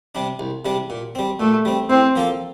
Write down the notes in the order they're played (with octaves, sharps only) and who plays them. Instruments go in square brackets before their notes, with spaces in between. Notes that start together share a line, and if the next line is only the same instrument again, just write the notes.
[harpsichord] C3 G3 D4
C2
C3 G3 D4
A#2
G3 C4
[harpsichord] A#2 [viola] A3
[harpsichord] G3 C4
[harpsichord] A2 [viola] C4
[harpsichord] F3 A#3 F4 A4